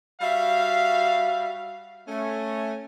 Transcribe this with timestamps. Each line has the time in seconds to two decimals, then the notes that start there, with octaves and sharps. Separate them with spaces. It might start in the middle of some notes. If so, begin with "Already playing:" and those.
0.21 G3 F#4 E5 F5
2.07 A3 C#4